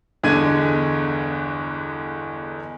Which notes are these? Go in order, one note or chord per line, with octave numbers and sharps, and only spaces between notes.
G1 E2 D3 G#3 G#6 D#7